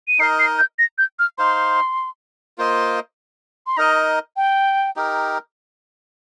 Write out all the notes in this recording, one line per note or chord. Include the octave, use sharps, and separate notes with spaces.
D#7
D#4 A#4 D#5 C7
C7
G6
A#6
G6
F6
D#4 C5 F5 C6
A#3 F4 C5 D#5
C6
D#4 A#4 D#5 A#5
G5
D#4 G4 A#4